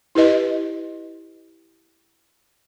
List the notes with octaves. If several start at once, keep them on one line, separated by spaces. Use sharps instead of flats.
E4 G4 B4 D#5